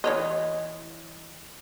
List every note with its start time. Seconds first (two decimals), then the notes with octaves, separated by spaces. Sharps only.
0.04 E3 C#5 D#5